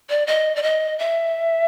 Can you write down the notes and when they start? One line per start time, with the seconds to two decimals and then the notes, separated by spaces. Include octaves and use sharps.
0.10 D5
0.27 D#5
0.56 D5
0.63 D#5
0.99 E5